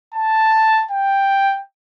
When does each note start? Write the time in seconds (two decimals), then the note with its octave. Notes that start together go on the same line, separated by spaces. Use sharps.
0.14 A5
0.91 G5